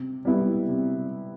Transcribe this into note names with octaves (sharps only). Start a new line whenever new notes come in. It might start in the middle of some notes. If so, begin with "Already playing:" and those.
Already playing: C3
G3 B3 E4
C3